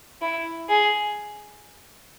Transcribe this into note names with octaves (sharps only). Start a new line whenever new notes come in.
E4
G#4